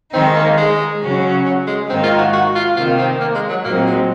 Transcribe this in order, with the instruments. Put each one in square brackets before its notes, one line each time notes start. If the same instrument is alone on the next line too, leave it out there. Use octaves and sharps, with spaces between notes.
[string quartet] D#3 G#3 D#4 [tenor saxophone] C4
[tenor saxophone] A#3
G#3
[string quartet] C#3 F#3 C#4 F#4
[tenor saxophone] F#3
G#3
[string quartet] G#2 D#3 A#3 D#4 [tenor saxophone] C4
[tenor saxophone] F4
F#4
F#4
F4
[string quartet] C3 D#3 A#3 [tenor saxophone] F4
[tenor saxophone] C4
A#3
G#3
F#3
[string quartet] A#2 F#3 C4 D#4 [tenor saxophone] A#3
[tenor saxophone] G#3